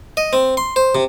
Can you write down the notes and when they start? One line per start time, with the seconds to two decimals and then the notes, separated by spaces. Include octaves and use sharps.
0.17 D#5
0.33 C4
0.57 C6
0.76 C5
0.95 C3